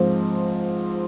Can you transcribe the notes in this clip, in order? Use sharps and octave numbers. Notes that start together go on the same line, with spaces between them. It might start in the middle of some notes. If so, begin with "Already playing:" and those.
Already playing: G#2 F3 C4